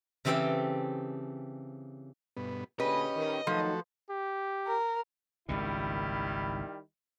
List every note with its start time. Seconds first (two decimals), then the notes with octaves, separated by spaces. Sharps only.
0.25 C#3 E3 C4 G4 A4 G5
2.37 G2 B2 B3
2.80 A#2 D3 C#4 G4 G#4 B4 D#5
3.16 D#3
3.47 D#3 F3 F#3 A3 D#4 F#4 A4
4.10 G4
4.67 A#4
5.49 G#1 C#2 A#2 D#3 G3 E4